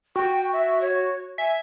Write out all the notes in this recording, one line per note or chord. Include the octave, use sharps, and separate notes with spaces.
F#4 G5
E5
C#5
E5 G#5